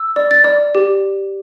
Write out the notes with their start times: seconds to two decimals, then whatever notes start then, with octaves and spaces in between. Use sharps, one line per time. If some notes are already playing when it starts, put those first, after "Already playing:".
Already playing: E6
0.16 D5
0.31 A6
0.44 D5
0.75 G4